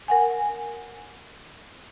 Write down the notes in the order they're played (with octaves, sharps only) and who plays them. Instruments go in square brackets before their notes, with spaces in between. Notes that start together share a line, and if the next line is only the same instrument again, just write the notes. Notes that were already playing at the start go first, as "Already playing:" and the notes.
[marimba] A#4 F#5 G#5